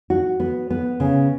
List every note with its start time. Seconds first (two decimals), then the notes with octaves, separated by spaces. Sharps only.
0.10 F#4
0.40 B3
0.70 B3
1.00 C#3